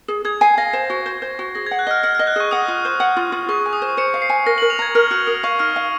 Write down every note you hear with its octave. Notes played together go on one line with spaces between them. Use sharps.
G#4
G#4 G#6
G#5 C7
F5 A#6
C5
F#4
C5
C5
F#4
G#4 A#6
F#5 G#6
F#6
D#5 F6
F#5 F6
D#5 F6
F#6
G#4 C#6
F#5 D#6
F4
C5
F#5
F4
F4
G#4 C#6
G#5
D#6
C5
C5 C#7
F5
C7
G#5
A#4 A#6
A#4 F#7
F7
A#5 G#6
A#4 F6
F#4 F6
A#4 D#6
F5 C#6
D#4 F6
F5